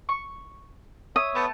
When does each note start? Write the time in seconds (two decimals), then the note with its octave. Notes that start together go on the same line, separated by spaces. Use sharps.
0.09 C#6
1.16 C#5 E5 D#6
1.35 A3 B3 A5